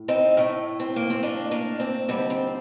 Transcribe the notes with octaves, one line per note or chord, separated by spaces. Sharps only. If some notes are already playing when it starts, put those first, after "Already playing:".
Already playing: A2
C4 D#4
A2 A3
C4
A#3
C4
A#3 D4
A#3 D4
C4
D#2 D3 G3 C4
C4